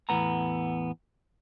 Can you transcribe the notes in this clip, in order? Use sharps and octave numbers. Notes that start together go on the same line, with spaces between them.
E2 A2 B3 A#5